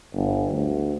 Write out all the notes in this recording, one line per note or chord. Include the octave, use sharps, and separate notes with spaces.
G1
D2